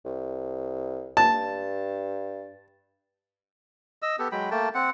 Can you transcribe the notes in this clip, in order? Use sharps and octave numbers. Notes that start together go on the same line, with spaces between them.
C2
G2 A5
D#5 E6
B3 G4 A4
F#3 G#3 G5 B5
A3 A#3 G5 A5
C4 F#5